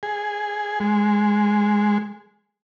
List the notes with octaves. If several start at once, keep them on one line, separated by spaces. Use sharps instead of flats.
G#4
G#3